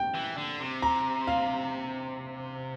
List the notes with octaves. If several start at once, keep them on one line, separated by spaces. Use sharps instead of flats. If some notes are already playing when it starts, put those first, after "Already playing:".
Already playing: G5
E3
D3
C3
A#5
F5